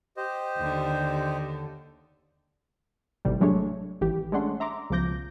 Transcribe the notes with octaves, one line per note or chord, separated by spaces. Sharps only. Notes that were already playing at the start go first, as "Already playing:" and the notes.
G4 C5 D#5
D#2 D3
G#1 A2 C3 G3
F#3 G#3 A3 D4 C#5
G#1 E3 G4
G#3 A3 C#4 D4 F#5 C6
E5 A#5 C6 D6
C#2 B2 F3 D6 G6 A#6